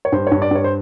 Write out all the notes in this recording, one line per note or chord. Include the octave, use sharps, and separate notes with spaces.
C#5
G2 C5
G2 C#5
D5
G2 C#5
C5